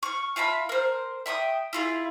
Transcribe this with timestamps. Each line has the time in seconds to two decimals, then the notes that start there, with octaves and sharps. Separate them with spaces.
0.03 C#6 F6
0.36 F4 E5 A5 B5
0.69 A#4 C5
1.26 E5 G5 B5 D#6
1.73 E4 F4 G#4